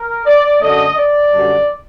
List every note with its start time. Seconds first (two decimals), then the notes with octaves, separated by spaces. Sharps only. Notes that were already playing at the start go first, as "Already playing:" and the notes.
Already playing: A#4
0.26 D5
0.60 F#2 D3 A3 D4 D#5
0.96 D5
1.32 F#2 D3 G3 D4